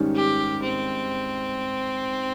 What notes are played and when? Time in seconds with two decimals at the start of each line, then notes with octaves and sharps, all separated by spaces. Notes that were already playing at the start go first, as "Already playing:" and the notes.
Already playing: G#2 D#3 G3 C#4
0.15 G4
0.62 C4